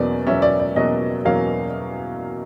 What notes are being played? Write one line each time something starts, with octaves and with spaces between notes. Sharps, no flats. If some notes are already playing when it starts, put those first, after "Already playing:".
Already playing: E2 B2 F#3 A#3 C#4 D5
E2 B2 F#3 A#3 C#4 E5
D5
D5
E2 B2 F#3 A#3 C#4 D#5
E2 B2 F#3 A#3 C#4 F5